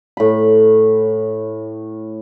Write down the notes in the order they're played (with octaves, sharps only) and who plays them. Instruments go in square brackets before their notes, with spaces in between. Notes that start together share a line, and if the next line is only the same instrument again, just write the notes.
[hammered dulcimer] A2 B5